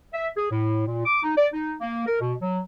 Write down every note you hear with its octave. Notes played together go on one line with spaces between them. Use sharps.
E5
G#4
A2
A#2
D6
D#4
D5
D#4
A#3
A#4
B2
F#3